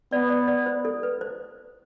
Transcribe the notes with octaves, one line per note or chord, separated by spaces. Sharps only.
B3 D5
D5
D5
C5
A4
B4
C5